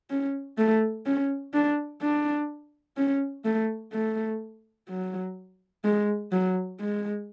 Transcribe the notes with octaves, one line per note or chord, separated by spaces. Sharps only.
C#4
A3
C#4
D4
D4
C#4
A3
A3
F#3
G#3
F#3
G#3